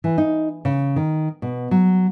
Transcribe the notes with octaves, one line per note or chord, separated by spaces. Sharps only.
E3
D#4
C#3
D#3
B2
F#3